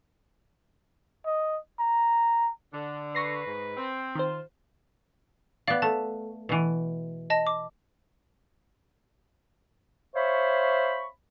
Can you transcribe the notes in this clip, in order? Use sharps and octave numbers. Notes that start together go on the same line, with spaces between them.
D#5
A#5
D3 D4
B4 C#6 A#6 C7
G#2
C4
D#3 F4 C5
B3 D5 F5
A3 A5
B2 E3
D#5 A5 A#6
D6
C5 C#5 E5 F5 B5 C#6